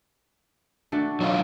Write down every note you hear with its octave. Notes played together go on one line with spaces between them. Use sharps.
A3 D4 F#4
F#3 D#4 F4